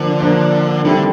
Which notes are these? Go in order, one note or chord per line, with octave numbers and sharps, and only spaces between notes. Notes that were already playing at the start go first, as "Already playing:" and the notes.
Already playing: D3 F3 A#3 D4
F3 A#3 D4
D3 D#3 G3 C4 E4 A4